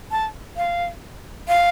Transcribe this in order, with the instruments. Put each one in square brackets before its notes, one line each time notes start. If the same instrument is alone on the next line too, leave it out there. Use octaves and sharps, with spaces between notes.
[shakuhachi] A5
F5
F5